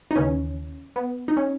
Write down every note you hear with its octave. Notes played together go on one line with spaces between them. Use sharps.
D#4
D#2 C#3 E3 C#4
B3
D#4
C#4